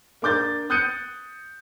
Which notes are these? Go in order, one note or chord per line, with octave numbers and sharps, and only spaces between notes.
A#3 D4 D6 G6 A6
D#6 F#6 G6 A6 C#7 D#7